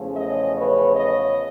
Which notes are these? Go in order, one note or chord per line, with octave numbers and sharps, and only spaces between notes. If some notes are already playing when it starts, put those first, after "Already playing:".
Already playing: E2 C#3 F3 A3 C#4
C#5 D#5
B4 C#5
C#5 D#5